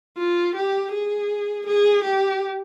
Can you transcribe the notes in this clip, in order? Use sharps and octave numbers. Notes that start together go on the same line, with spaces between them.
F4
G4
G#4
G#4
G4